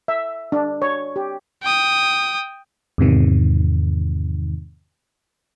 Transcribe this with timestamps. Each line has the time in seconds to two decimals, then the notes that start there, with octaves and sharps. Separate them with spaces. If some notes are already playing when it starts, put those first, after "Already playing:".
0.08 E5
0.52 D4
0.82 C#5
1.16 G4
1.63 G5 D#6
2.98 E2 G#2 C3 D#3